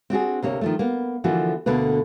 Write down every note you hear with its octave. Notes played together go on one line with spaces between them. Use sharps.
C4 D4 F#4 G#4
D2 C3 A#3 C#5
D#3 F3 A3
A#3 B3
D3 E3 F3 A#3 F#4
D2 B2 D3 A#3 B4